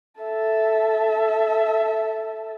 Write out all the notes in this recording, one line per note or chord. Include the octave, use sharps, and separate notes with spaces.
A4 E5